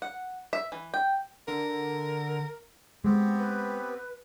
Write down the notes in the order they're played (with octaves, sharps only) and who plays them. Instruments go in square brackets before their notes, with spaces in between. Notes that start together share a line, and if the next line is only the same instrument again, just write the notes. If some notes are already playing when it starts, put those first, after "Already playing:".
[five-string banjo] F#5
E5
E3
G5
[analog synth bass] D3 [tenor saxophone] A#4
[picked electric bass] G#3 [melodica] B3 C4 G4
[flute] B4